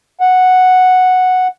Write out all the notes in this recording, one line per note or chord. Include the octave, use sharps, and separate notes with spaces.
F#5